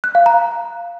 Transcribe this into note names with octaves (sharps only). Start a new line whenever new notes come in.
F#6
F5
A#5